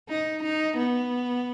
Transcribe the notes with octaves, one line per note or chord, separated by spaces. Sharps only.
D#4
D#4
B3